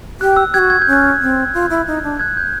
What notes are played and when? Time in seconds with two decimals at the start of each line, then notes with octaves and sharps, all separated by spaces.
0.20 G4 F#6
0.37 E6
0.54 F#4 G4 F#6 G#6
0.70 G#6
0.82 G6
0.87 C#4
0.93 F#6 G#6
1.21 C4
1.54 F4
1.70 E4
1.87 D#4
2.03 D4
2.20 F#6 G#6
2.37 G6